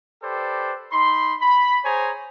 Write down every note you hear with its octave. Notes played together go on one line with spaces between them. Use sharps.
G4 A4 B4 C5 D5
D#4 B5 C6
B5
G#4 C5 C#5 G#5 A#5